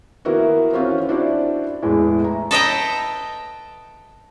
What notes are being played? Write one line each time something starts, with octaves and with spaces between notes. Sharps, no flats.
D#3 A#3 B3 E4 F#4
E3 C4 C#4 F4 F#4
D4 E4 F#4 C5 D5
E2 A2 E3 G#3
E4 A#5
A4 B4 D#5 E5 G5 A#5